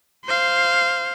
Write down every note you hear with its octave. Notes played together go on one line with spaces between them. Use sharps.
C5 F5